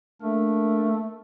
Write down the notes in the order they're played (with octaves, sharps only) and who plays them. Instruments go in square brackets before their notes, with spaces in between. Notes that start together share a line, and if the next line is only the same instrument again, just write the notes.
[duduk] A3 [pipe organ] A#3 D4 A#4